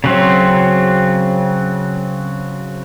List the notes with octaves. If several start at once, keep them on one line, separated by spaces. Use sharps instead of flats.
C#3 F#3 C4